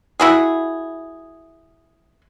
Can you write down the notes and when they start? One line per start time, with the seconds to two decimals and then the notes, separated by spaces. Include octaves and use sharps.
0.20 E4 F#4 G#4